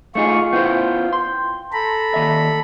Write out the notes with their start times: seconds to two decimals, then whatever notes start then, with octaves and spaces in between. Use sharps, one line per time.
0.15 A3 D#4 F4 G#4 C#6
0.53 B3 E4 C5 G5
1.13 C6
1.73 A4 A#5 B5
2.14 D#2 E5